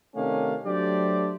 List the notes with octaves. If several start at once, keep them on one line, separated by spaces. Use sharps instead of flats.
C3 D#3 A3 C#4 D4 F5
F#3 A3 D4 G4 C5 D5